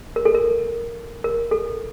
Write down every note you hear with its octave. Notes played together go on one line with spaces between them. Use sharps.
A#4
A4
A#4
A#4
A4